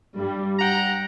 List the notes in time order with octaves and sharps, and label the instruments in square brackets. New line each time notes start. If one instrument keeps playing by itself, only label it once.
[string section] G2 G3
[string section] G2 [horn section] F#5 G5 A#5